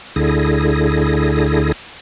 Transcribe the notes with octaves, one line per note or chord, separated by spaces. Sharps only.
D2 D3 E4 G#4 A#6